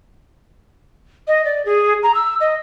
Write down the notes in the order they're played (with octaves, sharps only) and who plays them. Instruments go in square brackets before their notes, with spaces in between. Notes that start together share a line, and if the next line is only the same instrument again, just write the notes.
[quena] D#5
D5
G#4
A#5
E6
D#5